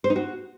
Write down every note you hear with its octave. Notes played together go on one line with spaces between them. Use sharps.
C5
D#4
F#4